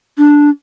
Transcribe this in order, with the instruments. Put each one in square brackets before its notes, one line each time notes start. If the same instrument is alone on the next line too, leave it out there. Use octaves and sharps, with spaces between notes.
[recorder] D4